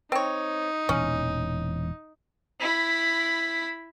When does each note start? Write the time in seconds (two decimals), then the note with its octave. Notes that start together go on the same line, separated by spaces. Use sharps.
0.12 C4 D#4 C#5
0.89 E1 A#2 E3 C#4
2.60 E4 B5